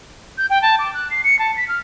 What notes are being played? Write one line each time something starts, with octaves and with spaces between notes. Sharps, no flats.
G6
G5
A5
D6
F#6
C7
C#7
A5
B6
F6